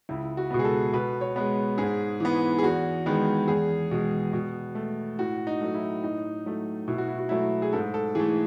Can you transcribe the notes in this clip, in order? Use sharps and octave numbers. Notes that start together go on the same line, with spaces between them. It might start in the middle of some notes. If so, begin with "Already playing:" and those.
C#2 E4
F#4
B2 G#3 B3
G#4
A4
B2 B4
C#5
G#3 B3
G#2 G#4
E3 B3
G#4
E2 F#4
D#3 G#3 B3
E2 G#4
B2 G#3
B2
A3
A2 F#4
D#4
F#3 A3
E4
A2 D#4
F#3 A3
B2 E4
F#4
E4
F#4
F#3 A3 E4
G#4
G#2 A4
A4
E3 A3 G#4